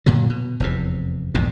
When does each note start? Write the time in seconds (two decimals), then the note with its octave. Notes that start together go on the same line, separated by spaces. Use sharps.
0.06 F#2 A#2 D3 F#3
0.30 B2
0.60 F1 E2 C3
1.34 A#1 E2 G#2 B2